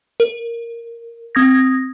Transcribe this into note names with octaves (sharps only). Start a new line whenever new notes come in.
A#4
C4 D#6 G#6 A#6